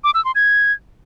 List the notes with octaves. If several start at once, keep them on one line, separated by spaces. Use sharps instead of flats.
D6
E6
C6
G#6